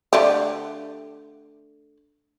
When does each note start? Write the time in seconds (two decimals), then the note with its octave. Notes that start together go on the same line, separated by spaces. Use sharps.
0.13 D3 A3 G4